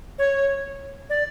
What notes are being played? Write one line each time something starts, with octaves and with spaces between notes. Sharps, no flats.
C#5
D5